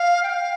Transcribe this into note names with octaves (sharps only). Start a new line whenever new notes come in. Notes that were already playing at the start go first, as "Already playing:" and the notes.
Already playing: F5
G5
F5